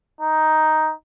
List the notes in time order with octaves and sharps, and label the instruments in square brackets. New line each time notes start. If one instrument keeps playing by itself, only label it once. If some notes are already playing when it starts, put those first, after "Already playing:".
[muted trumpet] D#4